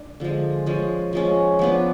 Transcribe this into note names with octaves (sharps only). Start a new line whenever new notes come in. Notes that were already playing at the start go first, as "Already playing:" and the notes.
Already playing: D4
D3 F3 G#3
F3 G#3 C#4
F3 G#3 C#4
F3 B3 D4